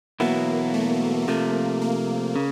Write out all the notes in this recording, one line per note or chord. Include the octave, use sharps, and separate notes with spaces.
E2 B2 F#3 A#3 B3 E4
A3
C3 F3 A3 A#3
A#3
C#3